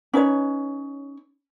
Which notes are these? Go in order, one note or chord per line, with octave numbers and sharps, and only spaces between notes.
C#4 D#4 B4 C#5